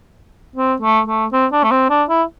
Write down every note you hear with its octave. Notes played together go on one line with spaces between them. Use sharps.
C4
A3
A3
C4
D4
A3
C4
D4
E4